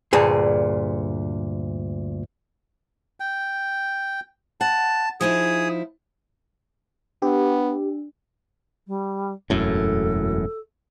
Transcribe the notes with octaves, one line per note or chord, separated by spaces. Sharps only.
D2 G2 A#2 G#4
G5
F#5 A5
F3 D#4 E4 G#4 D#6
B3 D4 G4
G3
E1 F#2 A2 A4